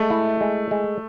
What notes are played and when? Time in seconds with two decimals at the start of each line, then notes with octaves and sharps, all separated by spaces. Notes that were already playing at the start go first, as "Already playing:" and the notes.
Already playing: G#3 A3
0.10 E4
0.41 G#3
0.71 G#3